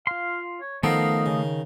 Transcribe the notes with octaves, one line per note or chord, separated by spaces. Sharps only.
F4 F5 C6
C#5
D#3 F3 A3 B3 A4 D#5 F5
C#3